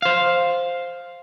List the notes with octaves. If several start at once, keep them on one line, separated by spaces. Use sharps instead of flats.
C5 F5